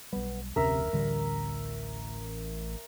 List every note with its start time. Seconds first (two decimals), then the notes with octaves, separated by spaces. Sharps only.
0.13 B1 G3 B3
0.56 F1 D2 C3 C#4 A#4 E5
0.93 A1 D2 D3 G3